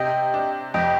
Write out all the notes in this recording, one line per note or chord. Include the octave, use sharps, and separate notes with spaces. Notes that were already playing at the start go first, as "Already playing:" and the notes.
Already playing: C3 D#5 G5
D4
F2 D#5 G5